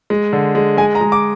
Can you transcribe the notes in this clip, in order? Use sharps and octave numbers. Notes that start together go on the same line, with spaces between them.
G#3
D3
G#3
G#3 G#5
A#5
G#3
D6